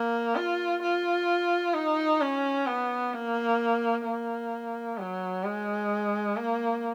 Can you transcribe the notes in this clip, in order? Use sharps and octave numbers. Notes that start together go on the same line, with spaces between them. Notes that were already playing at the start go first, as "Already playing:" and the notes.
Already playing: A#3
F4
F4
D#4
C#4
B3
A#3
A#3
F#3
G#3
A#3